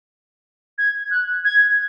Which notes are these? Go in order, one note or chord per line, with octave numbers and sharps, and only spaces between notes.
G#6
F#6
G#6